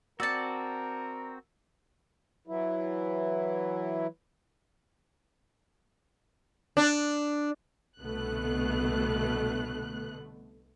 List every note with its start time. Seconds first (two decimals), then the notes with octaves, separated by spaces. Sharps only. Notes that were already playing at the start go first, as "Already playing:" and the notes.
0.20 C4 F#4 A#4 D5 A5 E6 A6 C#7
2.47 E3 F#3 E4
6.77 D4
8.00 C2 B2 D3 A3 B3 F#6